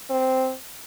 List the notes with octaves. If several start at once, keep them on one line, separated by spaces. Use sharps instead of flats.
C4